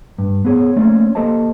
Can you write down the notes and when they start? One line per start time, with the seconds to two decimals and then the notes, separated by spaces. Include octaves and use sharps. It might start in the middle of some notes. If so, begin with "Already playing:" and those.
0.18 G2
0.45 B3 C4 G#4 A#4 C#5
0.76 A3 A#3 C4 C#4 D5
1.15 A#3 G4 A4 C5 D#5 A5